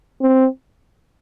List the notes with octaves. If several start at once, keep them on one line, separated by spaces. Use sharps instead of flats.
C4